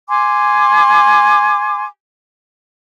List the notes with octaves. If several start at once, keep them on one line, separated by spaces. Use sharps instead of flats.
G#5 C6 D6